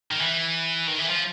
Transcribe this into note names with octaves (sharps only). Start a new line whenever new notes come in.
D#3
E3
D#3
E3
F3